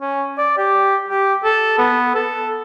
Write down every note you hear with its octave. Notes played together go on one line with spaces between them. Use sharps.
C#4
D5
G4
G4
A4
B3
A4